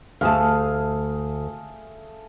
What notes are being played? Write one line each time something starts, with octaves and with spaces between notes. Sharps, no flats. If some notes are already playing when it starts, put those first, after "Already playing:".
D2 A3 G#4 F5 A5